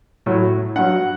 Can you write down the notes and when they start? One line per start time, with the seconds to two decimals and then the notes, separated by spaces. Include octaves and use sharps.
0.26 A2 F#3
0.76 G2 F#3 F#5